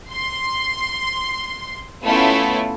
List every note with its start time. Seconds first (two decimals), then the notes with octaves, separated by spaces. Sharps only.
0.11 C6
2.05 A3 B3 C#4 E4 F4 A4